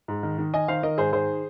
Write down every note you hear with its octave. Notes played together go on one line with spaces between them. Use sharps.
G#2
D#3
D#3
D#3 D#5 G#5
D#3 C5 F5
D#3 A#4 D#5
G#2 G#4 C5
D#3 G#4 C5